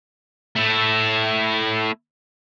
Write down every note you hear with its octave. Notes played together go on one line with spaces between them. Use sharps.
A3 E4